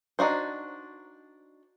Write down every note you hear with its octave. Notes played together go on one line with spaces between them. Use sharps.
D4 D#4 F#4 C5